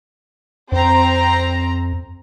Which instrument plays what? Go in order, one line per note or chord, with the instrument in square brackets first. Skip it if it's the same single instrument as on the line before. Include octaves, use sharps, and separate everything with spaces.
[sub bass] F2 [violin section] C4 A#5